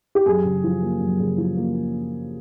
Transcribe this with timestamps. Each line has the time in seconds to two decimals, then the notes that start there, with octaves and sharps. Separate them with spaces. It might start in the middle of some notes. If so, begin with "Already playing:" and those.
0.15 G4
0.26 F#2 G#4
0.45 C#3
0.64 F3
0.83 A#3
1.01 F#2
1.20 C#3
1.38 F3
1.57 A#3